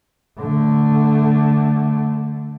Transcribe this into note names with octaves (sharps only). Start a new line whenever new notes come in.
D3 A3